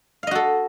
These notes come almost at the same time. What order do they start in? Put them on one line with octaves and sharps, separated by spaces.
F5 D#5 F#4 A4